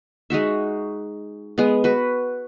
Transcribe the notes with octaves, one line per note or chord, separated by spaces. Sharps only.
G#3 D#4 F#4 E5
G#3 B3
F#4 B4